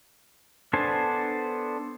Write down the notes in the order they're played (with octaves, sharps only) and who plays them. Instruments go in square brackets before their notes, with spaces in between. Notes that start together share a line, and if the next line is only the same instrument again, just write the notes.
[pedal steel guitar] B3 D4 A4 C5 G#5